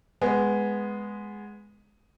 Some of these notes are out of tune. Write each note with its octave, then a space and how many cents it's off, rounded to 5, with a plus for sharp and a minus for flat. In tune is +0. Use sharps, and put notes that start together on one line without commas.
G#3 +0 B3 +0